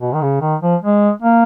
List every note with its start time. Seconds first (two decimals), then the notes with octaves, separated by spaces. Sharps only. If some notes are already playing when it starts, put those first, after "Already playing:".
0.01 B2
0.14 D#3
0.22 C#3
0.41 D#3
0.62 F3
0.82 G#3
1.23 A#3